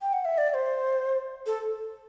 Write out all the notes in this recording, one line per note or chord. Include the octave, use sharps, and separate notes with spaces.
G5
F#5
E5
D5
D5
C5
A4